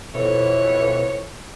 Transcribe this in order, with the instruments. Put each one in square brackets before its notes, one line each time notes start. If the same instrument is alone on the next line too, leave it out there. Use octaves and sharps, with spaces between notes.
[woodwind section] F2 E3 [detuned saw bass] B2 [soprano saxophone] C#5